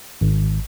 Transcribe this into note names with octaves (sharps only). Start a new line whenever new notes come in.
G#1